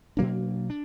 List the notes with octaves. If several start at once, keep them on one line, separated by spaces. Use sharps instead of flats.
B2 F#3 A#3 D4
D4